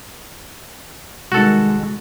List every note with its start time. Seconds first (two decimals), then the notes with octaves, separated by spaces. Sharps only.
1.32 C2 D#3 G#3 F#4 A4